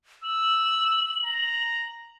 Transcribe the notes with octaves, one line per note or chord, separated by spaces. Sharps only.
E6 F#7
A#5